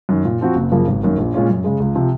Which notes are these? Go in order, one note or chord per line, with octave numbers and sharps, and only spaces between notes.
F#2 D#3
A#2
F3 C4 F#4
F#1
F#2 C#3 F3 A#3
G#1
F#2 D#3 A#3
A#1
A#2 G#3 C#4 F4
F#2
C#3 G#3
C#2
C3 F3